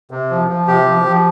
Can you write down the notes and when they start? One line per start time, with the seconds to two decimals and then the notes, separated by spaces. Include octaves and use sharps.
0.11 C3
0.30 F3
0.48 F3
0.67 C3 G4
0.86 F3
1.05 F3